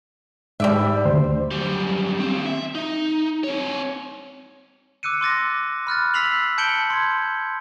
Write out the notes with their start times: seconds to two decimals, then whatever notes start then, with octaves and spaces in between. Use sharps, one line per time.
0.60 G#2 G3 D5 E5
1.05 D2 C5
1.51 F#2 G3
2.20 D#2 C4
2.46 E5
2.75 D#4
3.44 C4 C#5
5.03 D6 E6 F#6 C#7 D#7
5.21 C6 D6 A6 A#6
5.87 B5 F6 F#6 A6
6.14 E6 A6 B6 C7 F7 F#7
6.58 A5 G6 C#7 D7 F#7 G7
6.90 C6 G#6